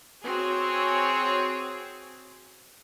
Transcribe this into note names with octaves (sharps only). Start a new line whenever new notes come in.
C4 F#4 G#4 C#5